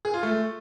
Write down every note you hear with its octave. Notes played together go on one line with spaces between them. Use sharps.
G#4
F4
A3